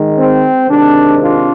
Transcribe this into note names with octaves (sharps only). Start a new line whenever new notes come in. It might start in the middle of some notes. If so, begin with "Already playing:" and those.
Already playing: D#3 G#3
C4
C3 D#3 G#3 C4 D4
D4 F4